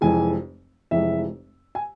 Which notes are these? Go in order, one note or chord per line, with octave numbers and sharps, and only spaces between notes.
F1 F2 E3 G#3 G#5
F1 F2 E3 G#3 E5
G#5